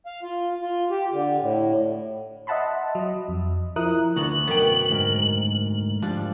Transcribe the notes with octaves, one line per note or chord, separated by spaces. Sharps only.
F5
F4
F4
G4
D3
A2
D#5 E5 F#5 A5 B5 C6
F#3 D#5
F2
F3 E4 A#4 D#6 F#6
D2 D3 B3 F#4 F#7
F#2 B2 B3 G5
D2 G#2 A#4
G#2 F3 G3 D4